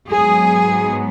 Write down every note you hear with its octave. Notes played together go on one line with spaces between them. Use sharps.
G#2 F#3 B3 G#4